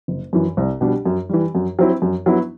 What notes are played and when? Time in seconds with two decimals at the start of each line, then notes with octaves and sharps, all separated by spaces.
0.08 F#1
0.33 F#2 E3
0.57 C2
0.81 B2 G3 D4
1.05 F#2
1.29 E3 G3
1.55 F#2
1.79 F#3 C4 E4
2.02 F#2
2.26 F#3 B3 E4